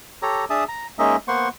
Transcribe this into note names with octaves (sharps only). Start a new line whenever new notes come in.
G4 A4 C#5 A#5
D4 G#4 E5 A5 D#6
A#5
G#3 A#3 C#4 D#4 D#5 E5
A#3 B3 C5 F#5 C6 C#6